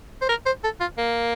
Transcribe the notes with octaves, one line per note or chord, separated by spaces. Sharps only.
C5
A#4
C5
A4
F4
A#3